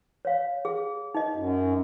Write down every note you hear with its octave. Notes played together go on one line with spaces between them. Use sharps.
C#5 F5
G#4
D#4 D#5
F#2